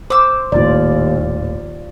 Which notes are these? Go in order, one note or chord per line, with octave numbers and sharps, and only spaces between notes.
C5 D6 E6
D#1 D#2 A2 F4 D5